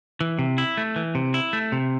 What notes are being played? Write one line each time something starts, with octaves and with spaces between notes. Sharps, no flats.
E3
C3
E4
A3
E3
C3
E4
A3
C3